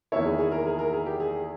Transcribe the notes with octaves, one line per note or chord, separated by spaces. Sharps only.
E2 D#3 A#3 E4 C#5
G#4
G#4
A#4
G#4
A#4
G#4
G4
G#4